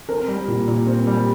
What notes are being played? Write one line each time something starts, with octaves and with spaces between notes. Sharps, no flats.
C4 A#4
G3
A#2
A#2
C4
G3